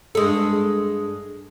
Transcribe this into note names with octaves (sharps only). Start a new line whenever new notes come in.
G2 G#3 A4